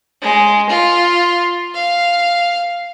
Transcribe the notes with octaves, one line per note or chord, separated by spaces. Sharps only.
G#3
F4
F5